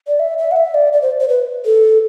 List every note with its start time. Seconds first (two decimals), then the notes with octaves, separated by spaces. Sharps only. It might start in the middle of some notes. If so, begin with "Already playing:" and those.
0.08 D5
0.20 E5
0.38 E5
0.52 F#5
0.56 E5
0.74 D5
0.93 D5
1.02 C5
1.20 C5
1.29 B4
1.65 A4